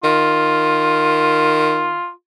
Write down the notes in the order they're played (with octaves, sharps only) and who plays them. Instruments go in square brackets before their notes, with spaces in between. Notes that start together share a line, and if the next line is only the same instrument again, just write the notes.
[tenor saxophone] D#3 [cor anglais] F4